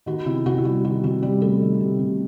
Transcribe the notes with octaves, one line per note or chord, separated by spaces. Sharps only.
D#3 F#4
C3 E4
C3 F#4
E4
G3 F#4
D#3 F#4
C3 F#4
C3 G3 G4
G3 A3 A4
D#3
C3
C3